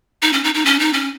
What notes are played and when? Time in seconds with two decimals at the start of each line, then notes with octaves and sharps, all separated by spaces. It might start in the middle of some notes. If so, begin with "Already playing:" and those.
0.22 D#4
0.33 C#4
0.44 D#4
0.54 D#4
0.66 C#4
0.79 D#4
0.93 C#4